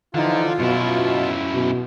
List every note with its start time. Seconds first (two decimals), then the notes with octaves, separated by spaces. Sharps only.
0.15 D3 E3 F3 D#4 F4
0.59 F#2 B2 E4
1.53 B2